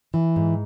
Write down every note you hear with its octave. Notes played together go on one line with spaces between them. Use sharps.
E3
G#2